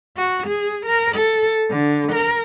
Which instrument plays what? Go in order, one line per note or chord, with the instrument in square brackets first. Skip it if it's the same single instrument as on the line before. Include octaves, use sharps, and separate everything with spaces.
[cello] F#4
G#4
A#4
A4
D3
A#4